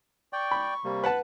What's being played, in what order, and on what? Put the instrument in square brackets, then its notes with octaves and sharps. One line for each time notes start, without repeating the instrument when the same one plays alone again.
[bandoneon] D5 G5 [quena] C#6
[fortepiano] B5
[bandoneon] C3 G3 A#3
[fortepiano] B4 F#5 A5